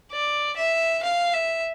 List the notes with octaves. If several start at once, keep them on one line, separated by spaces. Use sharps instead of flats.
D5
E5
F5
E5